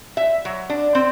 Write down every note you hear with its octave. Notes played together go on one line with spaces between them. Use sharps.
E5
F#3
D4
C4